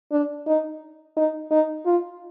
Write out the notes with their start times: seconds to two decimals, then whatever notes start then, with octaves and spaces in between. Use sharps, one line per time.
0.12 D4
0.47 D#4
1.17 D#4
1.51 D#4
1.86 F4